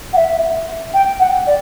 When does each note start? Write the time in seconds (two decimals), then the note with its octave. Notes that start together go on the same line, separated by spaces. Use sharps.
0.13 F#5
0.16 E5
0.93 G5
1.19 F#5
1.46 D5